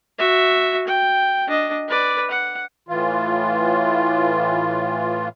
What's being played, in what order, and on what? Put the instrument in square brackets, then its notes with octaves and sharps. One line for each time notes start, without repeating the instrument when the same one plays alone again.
[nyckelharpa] F#4 E5
G5
D4 D#5
B4 D5
F#5
[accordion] A2 E3 F4